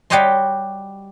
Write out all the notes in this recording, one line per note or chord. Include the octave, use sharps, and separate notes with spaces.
G3 F#4 G4 C#5 D#5 C6